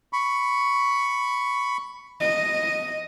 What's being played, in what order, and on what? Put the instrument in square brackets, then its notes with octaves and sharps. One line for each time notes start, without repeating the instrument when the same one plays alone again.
[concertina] B5 C#6
[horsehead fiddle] D#5